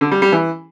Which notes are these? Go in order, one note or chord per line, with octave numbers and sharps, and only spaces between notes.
D3
G3
G3
E3